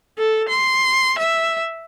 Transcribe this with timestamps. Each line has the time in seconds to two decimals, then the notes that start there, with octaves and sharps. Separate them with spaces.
0.18 A4
0.49 C6
1.19 E5